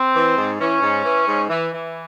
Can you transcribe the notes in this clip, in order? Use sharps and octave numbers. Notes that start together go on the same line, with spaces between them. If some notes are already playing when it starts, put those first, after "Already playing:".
Already playing: C4
E3
G#2
E3 C#4
G#2
E3
G#2
E3
E3